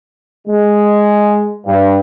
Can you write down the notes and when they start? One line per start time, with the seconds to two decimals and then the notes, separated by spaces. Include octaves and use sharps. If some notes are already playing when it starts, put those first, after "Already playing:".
0.46 G#3
1.66 G2